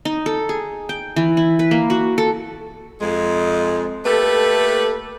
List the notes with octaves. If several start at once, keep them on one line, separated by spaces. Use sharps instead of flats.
D#4
A4
G#4
G5
E3
E4
B4
A#3
F#4
A4
F2 G#3
A3 A#3 G4 A4 B4